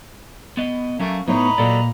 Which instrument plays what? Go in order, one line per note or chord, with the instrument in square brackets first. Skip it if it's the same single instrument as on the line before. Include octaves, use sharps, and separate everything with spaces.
[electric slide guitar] B3 D#5
[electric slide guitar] F#3 C#4 [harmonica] A3 A#3
[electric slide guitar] A2 A3 [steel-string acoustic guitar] B3 D#4 C#5 [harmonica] B4 D#5 A#5
[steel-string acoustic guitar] A#2 [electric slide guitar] F#3 A4 D5